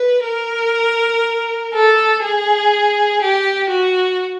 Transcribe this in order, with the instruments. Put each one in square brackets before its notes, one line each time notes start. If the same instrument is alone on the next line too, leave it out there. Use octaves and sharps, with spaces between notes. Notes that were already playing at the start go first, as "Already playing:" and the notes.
Already playing: [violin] B4
A#4
A4
G#4
G4
F#4